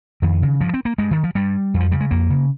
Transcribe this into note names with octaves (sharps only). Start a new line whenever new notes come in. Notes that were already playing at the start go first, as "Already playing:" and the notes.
F2 D#3
C#3
G2 F3
C4
A#3
G2 G#3
D#3
F3
G2 G3
F2
F3
C#3 G3
G#3
F2 A#3
C#3